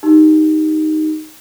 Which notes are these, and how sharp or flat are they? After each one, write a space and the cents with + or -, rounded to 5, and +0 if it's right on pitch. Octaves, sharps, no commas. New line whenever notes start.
D#4 +0 G4 +0